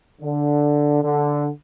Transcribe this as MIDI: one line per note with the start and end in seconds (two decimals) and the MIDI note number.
0.21 1.01 50
1.02 1.48 50